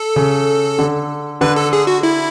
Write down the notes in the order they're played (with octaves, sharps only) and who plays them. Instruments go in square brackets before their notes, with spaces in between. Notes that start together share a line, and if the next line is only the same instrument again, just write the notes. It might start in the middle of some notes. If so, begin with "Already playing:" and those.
Already playing: [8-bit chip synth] A4
[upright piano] C#3
D3
[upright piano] D3 [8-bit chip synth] B4
[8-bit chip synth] A4
G#4
F#4
E4